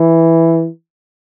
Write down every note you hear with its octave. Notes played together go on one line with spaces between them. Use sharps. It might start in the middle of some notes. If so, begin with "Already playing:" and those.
Already playing: E3